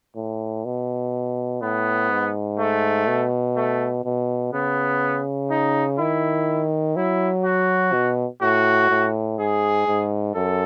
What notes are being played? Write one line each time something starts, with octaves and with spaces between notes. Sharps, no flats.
A2
B2
A2 B3
G#2
A3
B2
A3
B2
C#3 B3
D#4
D#3 E4
F#3 E4
F#4
B2
A2 F#4
A2
G#2 G#4
G#2
F#2 A4